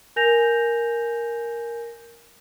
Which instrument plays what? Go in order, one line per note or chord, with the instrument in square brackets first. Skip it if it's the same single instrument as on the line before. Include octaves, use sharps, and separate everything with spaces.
[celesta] A#4 G#5 G6 A#6 F7